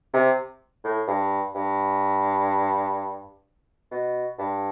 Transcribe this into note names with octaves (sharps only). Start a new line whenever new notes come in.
C3
A2
G2
G2
B2
G2